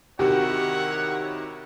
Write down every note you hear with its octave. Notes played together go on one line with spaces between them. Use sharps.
C3 D#3 E4 F#4 G4 C#5 F#5